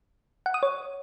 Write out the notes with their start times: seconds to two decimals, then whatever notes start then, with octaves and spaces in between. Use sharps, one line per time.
0.46 F#5
0.54 D#6
0.63 C#5